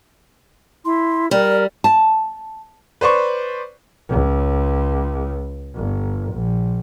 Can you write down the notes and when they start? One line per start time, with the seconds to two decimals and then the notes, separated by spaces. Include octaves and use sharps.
0.85 E4 C6
1.31 G3 A#4 D5
1.84 A5
3.01 B4 C5 D5 C#6
4.10 C#2
5.75 G1
6.32 A#1